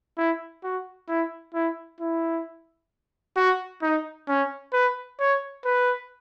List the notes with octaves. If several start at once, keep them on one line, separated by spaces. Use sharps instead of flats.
E4
F#4
E4
E4
E4
F#4
D#4
C#4
B4
C#5
B4